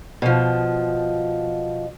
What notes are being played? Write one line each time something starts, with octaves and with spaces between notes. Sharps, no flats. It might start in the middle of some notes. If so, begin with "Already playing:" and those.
B2 F3